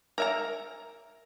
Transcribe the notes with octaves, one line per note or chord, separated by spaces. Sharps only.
A#4 E5 A#5